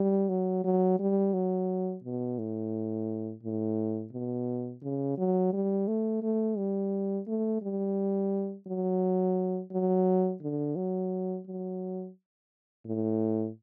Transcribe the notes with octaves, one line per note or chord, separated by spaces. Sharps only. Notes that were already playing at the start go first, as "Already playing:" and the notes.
Already playing: G3
F#3
F#3
G3
F#3
B2
A2
A2
B2
C#3
F#3
G3
A3
A3
G3
A3
G3
F#3
F#3
D3
F#3
F#3
A2